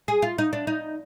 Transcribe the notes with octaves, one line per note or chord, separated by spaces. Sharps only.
G#4
F4
D#4
D4
D#4